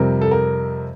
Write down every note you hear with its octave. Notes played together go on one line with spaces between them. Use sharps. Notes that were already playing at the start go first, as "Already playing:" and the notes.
Already playing: F2 C3 G3 A#4
A4
A#4